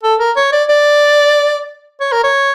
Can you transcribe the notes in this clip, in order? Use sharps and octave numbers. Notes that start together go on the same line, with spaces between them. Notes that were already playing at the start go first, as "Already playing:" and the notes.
A4
A#4
C#5
D5
D5
C#5
A#4
C#5